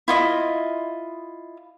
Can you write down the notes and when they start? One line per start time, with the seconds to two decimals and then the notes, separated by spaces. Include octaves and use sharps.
0.08 E4 F4 D#5